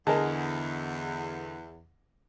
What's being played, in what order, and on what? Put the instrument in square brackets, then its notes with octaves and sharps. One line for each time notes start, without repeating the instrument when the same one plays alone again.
[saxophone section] E2 [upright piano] D3 [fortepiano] G#4 A#4 [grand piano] D#5 A5